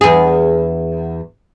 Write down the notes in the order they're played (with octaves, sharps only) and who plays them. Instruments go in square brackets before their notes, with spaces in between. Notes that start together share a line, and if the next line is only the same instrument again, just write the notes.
[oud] E2 G#4